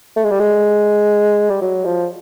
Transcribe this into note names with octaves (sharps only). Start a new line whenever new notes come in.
A3
G#3
G3
G#3
G3
F#3
F3